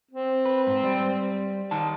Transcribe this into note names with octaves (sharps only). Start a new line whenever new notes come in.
C4
B4
G#2
G3
D#3 D#4 A5